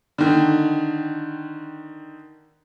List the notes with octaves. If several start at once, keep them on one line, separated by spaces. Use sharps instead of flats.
D3 D#3